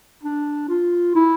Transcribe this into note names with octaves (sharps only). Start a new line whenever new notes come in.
D4
F4
E4